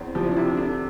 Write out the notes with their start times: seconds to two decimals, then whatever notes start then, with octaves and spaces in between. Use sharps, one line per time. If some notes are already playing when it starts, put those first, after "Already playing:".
Already playing: E2 C4
0.15 F3 G4
0.26 E4
0.31 D4
0.36 C3 E4
0.47 D4
0.57 D3 D4